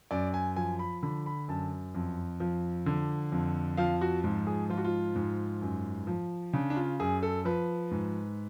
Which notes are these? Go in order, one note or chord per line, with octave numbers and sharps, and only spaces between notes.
F#2 D5
G#5
F3 G#5
B5
D3 B5
B5
F#2 A5
F2
F3
D3
F2
F3 F5
F#4
G#2 F4
G#4
F3 F4
F#4
F4
G#2
F#2
F3
C#3 D4
D4
F4
F#2 G#4
A4
F3 B4
G#2